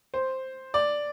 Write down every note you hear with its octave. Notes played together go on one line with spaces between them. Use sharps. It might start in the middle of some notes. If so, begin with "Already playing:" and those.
C5
D5